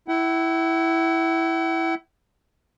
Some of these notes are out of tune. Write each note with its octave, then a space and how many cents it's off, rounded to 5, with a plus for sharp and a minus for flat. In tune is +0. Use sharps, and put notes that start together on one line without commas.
E4 +0 F#5 +45